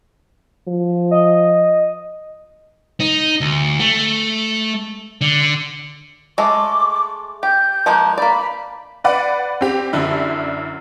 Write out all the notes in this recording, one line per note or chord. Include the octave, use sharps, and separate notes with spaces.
F3
D#5
D#4
D2
A3
D3
G#3 A3 D6
G4 G6
F3 G#3 A#3
A#3 D5 B5
B4 D5 F#5
C4 G4
F#2 D3 D4 E4